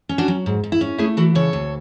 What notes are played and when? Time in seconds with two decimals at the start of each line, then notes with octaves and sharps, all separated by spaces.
0.09 C#4
0.18 D4 F#4
0.28 F#3
0.46 G#2
0.64 G#2
0.72 E4
0.81 C#4
0.98 A3 E4 G#4
1.17 E3 F#4 A4
1.35 C#3 A4 C#5
1.53 D2